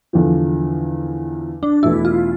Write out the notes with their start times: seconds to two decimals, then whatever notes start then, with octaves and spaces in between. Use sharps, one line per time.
0.13 E2 D3 F3
1.63 D4
1.83 E2 B2 A3 E4
2.05 F4